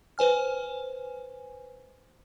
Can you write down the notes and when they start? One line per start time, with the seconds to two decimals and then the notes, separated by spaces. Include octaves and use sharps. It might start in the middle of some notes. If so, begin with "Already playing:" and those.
0.18 B4 C5 G#5 F6